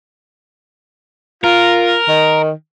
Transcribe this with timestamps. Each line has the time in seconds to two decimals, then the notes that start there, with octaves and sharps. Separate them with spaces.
1.44 F4 A#4
2.08 D#3